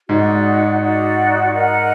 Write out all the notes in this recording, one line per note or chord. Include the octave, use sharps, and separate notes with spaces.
G#2 D#4 F#4 D5 F#5
D#4 F#4 D5 F#5
A#4 D#5 F#5